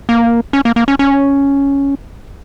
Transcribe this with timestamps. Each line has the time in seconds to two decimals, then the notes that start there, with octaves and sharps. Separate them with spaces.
0.09 A#3
0.53 C#4
0.65 A#3
0.76 A#3
0.88 C#4
0.99 C#4